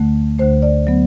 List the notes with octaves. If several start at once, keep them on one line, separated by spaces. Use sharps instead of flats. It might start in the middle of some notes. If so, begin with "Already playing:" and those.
Already playing: D2 D3 A3
D2 D3 A3 C5
D5
F#3 B3